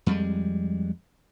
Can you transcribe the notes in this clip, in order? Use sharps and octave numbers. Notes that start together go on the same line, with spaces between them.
F2 G3 G#3